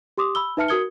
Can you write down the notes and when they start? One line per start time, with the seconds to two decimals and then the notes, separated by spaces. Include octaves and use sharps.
0.18 G4 C6 D6 D#6
0.35 B5 E6 G7
0.57 D#4 B4 E5 A5 F6 C#7
0.68 F#4 A#4 D#6 G#6 C#7 G7